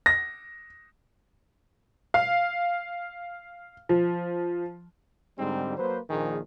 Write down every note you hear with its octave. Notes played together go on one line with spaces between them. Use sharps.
A#6
F5
F3
G#2 D3 G3 G#3 C4 D#4
F#3 A#3 B4 C5
A#1 D#3 G#4